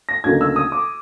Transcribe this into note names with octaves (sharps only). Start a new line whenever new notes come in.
A#6
D2 C#3 F#3 A#3 D#4 G#6
E6
D#6
D6